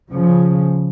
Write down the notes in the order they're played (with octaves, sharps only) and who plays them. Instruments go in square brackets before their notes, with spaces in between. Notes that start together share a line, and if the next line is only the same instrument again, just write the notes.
[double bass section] C#3 F3